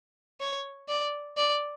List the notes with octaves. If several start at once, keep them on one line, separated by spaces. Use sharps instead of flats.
C#5
D5
D5